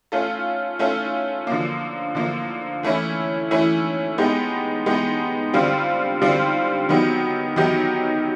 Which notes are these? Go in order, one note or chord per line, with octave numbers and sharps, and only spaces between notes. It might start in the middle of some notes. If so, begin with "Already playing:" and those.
A3 C#4 F4 A4
A3 C#4 F4 A4
D3 F3 A#3
D3 F3 A#3
E3 A3 C#4 E4
E3 A3 C#4 E4
G#3 B3 D#4 G4
G#3 B3 D#4 G4
D3 G3 C4 F4
D3 G3 C4 F4
D#3 F#3 B3 D#4 G4
D#3 F#3 B3 D#4 G4